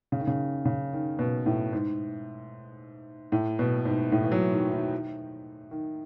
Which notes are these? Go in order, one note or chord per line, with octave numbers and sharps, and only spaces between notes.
C#3
D#3
C#3
C#3
D#3
B2
A2
G#2
A2
B2
G#2
A2
E3
F#3
D#3
D#3
D#3